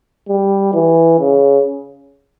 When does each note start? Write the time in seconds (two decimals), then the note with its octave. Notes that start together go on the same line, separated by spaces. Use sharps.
0.29 G3
0.74 E3
1.19 C#3